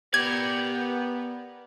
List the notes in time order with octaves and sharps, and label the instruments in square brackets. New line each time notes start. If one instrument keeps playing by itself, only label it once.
[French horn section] B3 [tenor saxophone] G4 [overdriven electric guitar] A#4 D5 [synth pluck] G#6